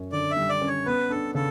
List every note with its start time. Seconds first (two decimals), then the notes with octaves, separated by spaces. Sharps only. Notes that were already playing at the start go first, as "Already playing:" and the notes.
Already playing: F#2 C#4
0.12 D3 D5
0.31 E5
0.37 G3
0.49 D5
0.62 C#4
0.68 C#5
0.86 B3 B4
1.10 D4 A4
1.35 C#3 A4